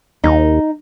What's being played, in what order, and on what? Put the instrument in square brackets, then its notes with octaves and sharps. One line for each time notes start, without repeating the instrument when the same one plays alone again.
[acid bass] D#2 [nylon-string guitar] D#4